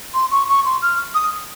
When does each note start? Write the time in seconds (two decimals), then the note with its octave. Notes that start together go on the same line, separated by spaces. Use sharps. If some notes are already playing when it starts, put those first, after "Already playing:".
0.13 C6
0.31 C#6
0.48 C#6
0.65 C6
0.81 F6
1.14 D#6